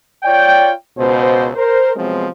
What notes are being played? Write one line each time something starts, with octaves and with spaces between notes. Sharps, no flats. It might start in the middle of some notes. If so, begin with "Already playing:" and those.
F4 C#5 D5 G5
C#2 B2 C5
A#4 C5
C3 F3 F#3 G#3 B3 C4